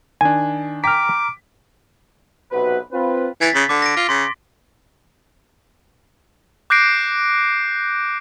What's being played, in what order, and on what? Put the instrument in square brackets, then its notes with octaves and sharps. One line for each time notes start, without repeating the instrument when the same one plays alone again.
[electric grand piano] D#3 D4 [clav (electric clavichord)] G#5
[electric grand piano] G5 B6 [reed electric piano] A#5 F6 [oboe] D6
[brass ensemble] B1 C3 F#4 B4
C4 F4 B4
[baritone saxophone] E3 [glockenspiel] G#6 A6 B6
[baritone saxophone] C#3
[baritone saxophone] D3 [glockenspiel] D6
[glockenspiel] A#6 D7
[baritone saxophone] F4
[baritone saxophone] C#3 [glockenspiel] C6 B6
[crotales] D6 F#6 G6 A#6 C7 D7